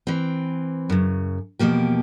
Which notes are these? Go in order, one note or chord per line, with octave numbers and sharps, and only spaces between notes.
E3 C4
F#2 C#3
E2 B2 F3 A#3 G4